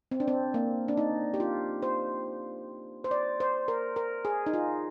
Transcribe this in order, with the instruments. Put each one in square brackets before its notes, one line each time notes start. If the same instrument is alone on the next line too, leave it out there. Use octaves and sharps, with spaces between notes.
[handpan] C4
D4
C4
A#3
D4
D#4
G4
F4
C5
C5
D5
C5
A#4
A#4
G#4
D#4
F4